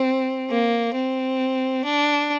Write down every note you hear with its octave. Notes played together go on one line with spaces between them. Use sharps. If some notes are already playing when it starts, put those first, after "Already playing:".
Already playing: C4
A#3
C4
D4